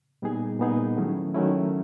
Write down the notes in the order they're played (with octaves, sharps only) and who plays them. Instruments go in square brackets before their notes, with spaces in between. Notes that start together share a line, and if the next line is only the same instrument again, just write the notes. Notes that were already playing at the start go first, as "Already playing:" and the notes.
[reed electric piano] A#2 G3 B3 D#4 G#4
A#2 G3 B3 D#4 G#4
D#3 F#3 A3 C#4 E4
D#3 F#3 A3 C#4 E4